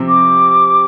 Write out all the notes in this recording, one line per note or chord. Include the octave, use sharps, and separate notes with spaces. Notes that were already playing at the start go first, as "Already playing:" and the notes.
Already playing: C3 F3 C4
D6